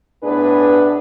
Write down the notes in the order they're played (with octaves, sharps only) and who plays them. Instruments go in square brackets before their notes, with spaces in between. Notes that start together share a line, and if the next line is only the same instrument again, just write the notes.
[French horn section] A2 B3 D4 G#4 B4